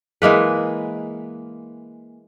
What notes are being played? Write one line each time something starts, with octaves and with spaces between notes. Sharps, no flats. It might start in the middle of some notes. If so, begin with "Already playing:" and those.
E3 G#3 A#3 B4